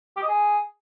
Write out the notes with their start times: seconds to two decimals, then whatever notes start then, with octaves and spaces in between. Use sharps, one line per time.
0.17 G4
0.23 D#5
0.29 G#4